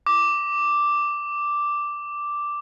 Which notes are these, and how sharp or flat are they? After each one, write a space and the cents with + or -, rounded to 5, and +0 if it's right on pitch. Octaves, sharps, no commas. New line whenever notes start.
D6 +0